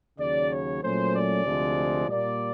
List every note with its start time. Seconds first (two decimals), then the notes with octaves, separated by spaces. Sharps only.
0.19 D#2 C#3 F#3 D5
0.50 C#5
0.82 A#2 F#3 A3 C#4 C5
1.14 D5
1.45 D2 C3 F3 G#3
2.07 A#2 G3 A#3 D5